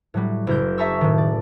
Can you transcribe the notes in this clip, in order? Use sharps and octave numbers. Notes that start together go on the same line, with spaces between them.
A2 F#3 G3
F#1 E4 A#4 G6
G#4 E5 A5 A#5 C#6 E6
A2 D#3
D5